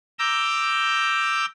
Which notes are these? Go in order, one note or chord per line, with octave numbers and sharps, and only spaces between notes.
A#5 D6 E6 G6